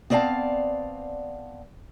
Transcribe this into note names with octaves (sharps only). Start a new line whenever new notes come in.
B3 C4 D5 D#5 F5 A5